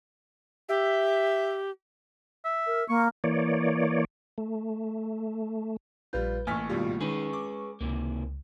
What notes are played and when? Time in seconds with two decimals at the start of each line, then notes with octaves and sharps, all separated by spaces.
0.69 G4 E5
2.45 E5
2.67 A#4
2.89 A#3 C#6
3.24 E3 A#3 C#5 D5
4.38 A3
6.13 A#1 G3 F4 B4 G6
6.47 A1 A2 A#3 G#5 C#6 F6 B6
6.69 G#1 B2 G3 F4 C#6
7.00 D#3 G#3 C#4 G#4 B4 C#6
7.33 D6
7.81 C#2 C3 D#3 A#3